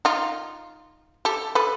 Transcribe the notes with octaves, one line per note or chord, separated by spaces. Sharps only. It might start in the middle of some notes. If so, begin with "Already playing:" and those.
D#4 F4
G4 A4
A4 B4